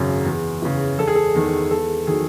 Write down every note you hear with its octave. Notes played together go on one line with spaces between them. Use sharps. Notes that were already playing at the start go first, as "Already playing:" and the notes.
Already playing: G#1 F#2 C#3 F#3
E2
C#3 E3
E1 A4
G#4
A4
E2 D#3
E2 A4
D#3 F#3 G#4